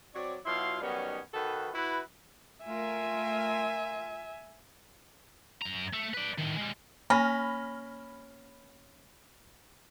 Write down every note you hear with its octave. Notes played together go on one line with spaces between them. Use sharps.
F#3 C4 C#5 D5
B2 F#3 E4 F4 F5 C6
D#3 F#3 G3 B3 C#4 D#4
D#3 F#4 A4 B4
E4 F#4 B4
A3 F4 A#4 E5 G#5
F#2 A#5
A3
B4 D5
A2 D#3
G3 G#3
A#3 C#4 B5 F6 A#6